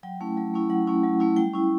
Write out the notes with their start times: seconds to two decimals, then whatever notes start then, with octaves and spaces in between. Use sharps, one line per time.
0.03 F#3 G5
0.20 A3 C#4 E4
0.37 F#3
0.54 A3 C#4 E4
0.70 F#3 F#5
0.87 A3 C#4 E4
1.04 F#3
1.20 A3 C#4 E4
1.36 G3 G5
1.54 C#4 E4